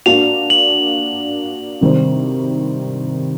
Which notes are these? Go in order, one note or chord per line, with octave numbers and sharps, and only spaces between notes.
A#3 D4 F#4 F7
F#7
C3 D#3 G3 C4